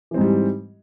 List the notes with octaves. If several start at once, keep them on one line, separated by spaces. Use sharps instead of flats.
G#2 E3 G3 C4